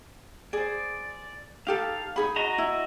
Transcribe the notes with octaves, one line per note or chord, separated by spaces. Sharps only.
G#4 C5 D5
D#4 G4 A4 F5
D#4 G#4 B5
F#4 D#5 A#5
E4